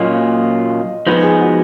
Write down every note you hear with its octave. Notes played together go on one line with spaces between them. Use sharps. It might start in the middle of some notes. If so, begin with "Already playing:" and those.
Already playing: A#2 F#3 A#3 C#4 F4 D#5
F3 G#3 B3 D#4 B4
G#4
F#4